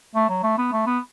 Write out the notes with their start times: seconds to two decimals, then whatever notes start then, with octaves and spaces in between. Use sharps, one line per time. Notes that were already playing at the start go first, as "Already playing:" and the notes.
0.15 A3
0.29 F#3
0.43 A3
0.58 B3
0.72 A3
0.86 B3